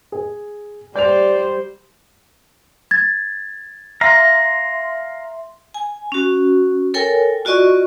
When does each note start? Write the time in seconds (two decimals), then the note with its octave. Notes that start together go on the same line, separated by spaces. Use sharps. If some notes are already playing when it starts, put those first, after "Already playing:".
0.12 G#4
0.96 G3 C5 D5 G6 F7
2.91 G#6 A6
4.01 E5 F5 A#5 C6
5.74 G#5
6.12 C#4 F#4
6.94 A4 A#4 C#5 G5 G#5
7.45 F4 F#4 D5 D#5 C#6